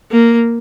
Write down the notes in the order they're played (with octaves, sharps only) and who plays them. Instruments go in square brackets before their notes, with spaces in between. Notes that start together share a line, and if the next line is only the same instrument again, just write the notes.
[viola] A#3